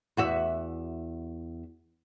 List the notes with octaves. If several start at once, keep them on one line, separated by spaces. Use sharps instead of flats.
E2 F#4 E5